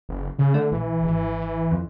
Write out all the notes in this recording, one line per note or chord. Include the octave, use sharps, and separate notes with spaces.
F#1
C#3
D3 A3
A#1 E3
G#1
F2